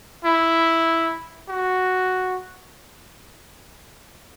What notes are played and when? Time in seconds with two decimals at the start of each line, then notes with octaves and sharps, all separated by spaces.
0.25 E4
1.49 F#4